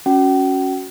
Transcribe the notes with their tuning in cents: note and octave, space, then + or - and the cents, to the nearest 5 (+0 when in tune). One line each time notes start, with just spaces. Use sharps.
C#4 +0 F#4 +0 G5 -45